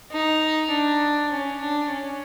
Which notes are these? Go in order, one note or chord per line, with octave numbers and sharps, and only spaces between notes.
D#4
D4
C#4
D4
C#4